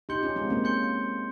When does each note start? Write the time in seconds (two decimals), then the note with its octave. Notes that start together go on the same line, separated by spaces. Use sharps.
0.09 D#4 G4 C6 G6 C#7 G7
0.22 C#4 F4
0.36 G#3 C4
0.50 A#3 C#4
0.64 C6 G6 C#7 G7